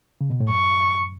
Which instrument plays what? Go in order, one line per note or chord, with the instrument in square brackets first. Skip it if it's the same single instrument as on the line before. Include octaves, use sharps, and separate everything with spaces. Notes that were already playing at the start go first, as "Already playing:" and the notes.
[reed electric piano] C#3
B2
A2
[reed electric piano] F#2 [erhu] C#6